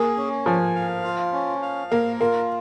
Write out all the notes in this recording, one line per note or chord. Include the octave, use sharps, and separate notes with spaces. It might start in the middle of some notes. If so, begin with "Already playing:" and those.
Already playing: A#3 G#4
C#4
F3 G#5
F5
F4
C#4
F5
A#3 A#4
A#3 F4